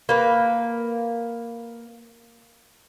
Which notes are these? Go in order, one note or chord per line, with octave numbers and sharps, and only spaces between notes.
A#3 B4